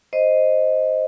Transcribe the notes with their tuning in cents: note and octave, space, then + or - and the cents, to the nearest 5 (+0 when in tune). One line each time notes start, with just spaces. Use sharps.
C5 +0 D#5 +0